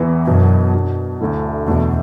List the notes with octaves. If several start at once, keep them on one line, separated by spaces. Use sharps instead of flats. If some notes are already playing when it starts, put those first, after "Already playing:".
Already playing: E2 E3 B3 E4
F#2 B2 B3 D4
B2 F#3 D4
D2 D3 A3 E4
E2 B2 A3 D4